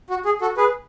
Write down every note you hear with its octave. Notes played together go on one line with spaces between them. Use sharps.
F#4
G#4
F#4 A4
G#4 B4